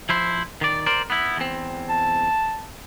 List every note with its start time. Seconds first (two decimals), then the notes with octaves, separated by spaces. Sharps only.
0.09 F3 E4 C5
0.61 D#3 D5
0.86 A#4 C5 D5
1.10 B3 E4
1.37 E2 C4
1.89 A5